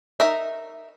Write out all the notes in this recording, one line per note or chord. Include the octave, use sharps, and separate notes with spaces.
D#4 A#4 E5